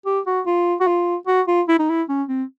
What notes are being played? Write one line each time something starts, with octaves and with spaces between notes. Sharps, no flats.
G4
F#4
F4
F#4
F4
F#4
F4
E4
D#4
E4
C#4
C4